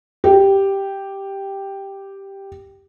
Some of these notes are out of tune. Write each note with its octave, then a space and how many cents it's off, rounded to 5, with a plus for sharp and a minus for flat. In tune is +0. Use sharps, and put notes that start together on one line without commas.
G4 +0